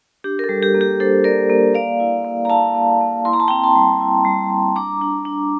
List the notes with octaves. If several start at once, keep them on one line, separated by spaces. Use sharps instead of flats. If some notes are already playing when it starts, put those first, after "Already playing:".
D4 G4
A#4
A4
G3
G4
A#3
G4
D4 A4 C5
A#3 A#4 D5
A#3
A#3 D5 F5
E4
A#3
A#5
E4 F5 A5
A#3
A#3
E4 C6
A#5
A5
C4 G5 A#5
A5 C6
G3
E4
G3
G3
D4 A#5 D6
D4
D4